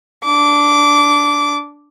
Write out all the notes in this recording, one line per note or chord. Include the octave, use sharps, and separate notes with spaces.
D4 D6